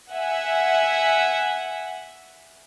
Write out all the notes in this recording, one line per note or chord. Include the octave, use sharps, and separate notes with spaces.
E5 F#5 G#5